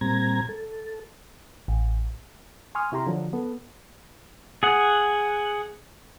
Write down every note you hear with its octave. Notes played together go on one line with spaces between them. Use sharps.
A#2 G3 C4 A#5 G#6
A4
A1
G#5 C6 C#6 D#6 F6
C3 E4 G4 A#5 C6
D3 F3 F#3
B3 A4
G#4 F#5